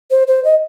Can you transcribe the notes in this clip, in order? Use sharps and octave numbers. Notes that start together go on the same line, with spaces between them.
C5
C5
D#5